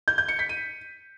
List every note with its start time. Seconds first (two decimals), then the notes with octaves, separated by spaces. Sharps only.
0.08 G6
0.18 G6
0.28 C#7
0.39 B6
0.49 D#7